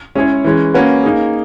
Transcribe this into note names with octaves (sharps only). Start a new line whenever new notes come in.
G#3 C#4 E4 G#4 C#5
E3 G#3 C#4
A#3 C#4 F#4 B4
A#3 D#4 G#4